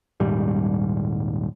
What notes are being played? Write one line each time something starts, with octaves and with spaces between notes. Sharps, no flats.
D#1 G#2 G3